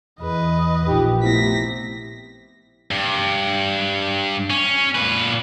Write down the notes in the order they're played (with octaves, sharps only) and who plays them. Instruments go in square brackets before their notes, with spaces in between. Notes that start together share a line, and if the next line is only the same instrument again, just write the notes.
[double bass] E2 [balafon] G#4 [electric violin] B4 D#5
[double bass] A#1 [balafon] D#4 F4 [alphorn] G4
[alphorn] C3 [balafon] A3 B3 E4 [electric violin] A#6 B6
[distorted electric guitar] G2
C#4
A#2 B4